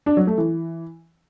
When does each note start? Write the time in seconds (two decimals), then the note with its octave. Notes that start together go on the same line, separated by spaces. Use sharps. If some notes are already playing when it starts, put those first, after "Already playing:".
0.06 D4
0.17 F#3
0.27 A3
0.38 E3